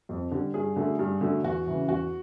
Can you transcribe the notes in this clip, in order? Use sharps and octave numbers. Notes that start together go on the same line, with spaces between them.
F2
D3 G3
G2 G#4
D3 F#3 A3
G2
D3 F#3 A3
E2 F#4
C#3 E3
E2 F#4